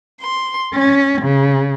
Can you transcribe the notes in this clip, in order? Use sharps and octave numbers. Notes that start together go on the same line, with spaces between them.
C6
C#4
C#3